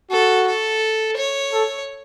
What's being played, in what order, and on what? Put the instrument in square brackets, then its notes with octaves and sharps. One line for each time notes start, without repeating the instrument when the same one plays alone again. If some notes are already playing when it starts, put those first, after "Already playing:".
[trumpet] F#4 [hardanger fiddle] A4
[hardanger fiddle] A4
C#5
[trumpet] A4